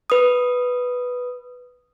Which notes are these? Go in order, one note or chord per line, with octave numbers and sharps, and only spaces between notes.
B4 D#6